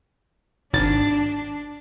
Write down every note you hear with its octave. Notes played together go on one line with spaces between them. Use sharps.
G#1 D4 A6